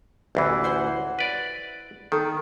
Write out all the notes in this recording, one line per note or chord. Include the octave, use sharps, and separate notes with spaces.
A1 D2 E3
E4 C5 F#5
B4 D5
D#3 A4